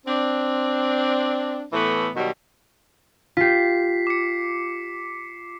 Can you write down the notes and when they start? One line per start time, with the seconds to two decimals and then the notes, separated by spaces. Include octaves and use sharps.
0.06 C4 D4
1.73 A2 E3 A3 B3
2.16 B2 D#3 F#3 G3
3.37 F4 G4 B6 C7
4.07 D6 C#7